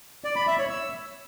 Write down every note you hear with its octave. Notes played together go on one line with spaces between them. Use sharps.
D5
B5
E5
C#5
E6